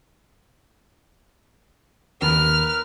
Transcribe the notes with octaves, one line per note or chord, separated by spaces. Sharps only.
D#2 A#4 B4 F6